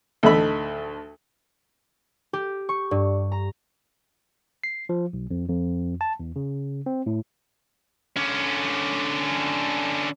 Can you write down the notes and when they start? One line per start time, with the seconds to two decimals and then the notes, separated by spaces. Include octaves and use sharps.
0.23 D2 A2 A3 D#4 E5 B5
2.33 G4
2.69 C#6
2.91 G2
3.32 A#5
4.64 C7
4.89 F3
5.13 B1
5.31 F2
5.49 F2
6.01 A5
6.20 E2
6.36 C#3
6.86 C4
7.06 A2
8.17 D3 C#4